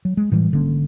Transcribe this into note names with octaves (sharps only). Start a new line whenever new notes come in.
F#3
G#3
A2 E3 G3
G#1 D3 A#3 C#4